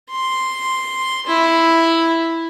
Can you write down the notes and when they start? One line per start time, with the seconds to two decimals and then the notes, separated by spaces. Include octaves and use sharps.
0.11 C6
1.27 E4